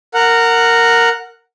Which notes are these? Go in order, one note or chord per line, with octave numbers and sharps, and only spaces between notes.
A#4 F#5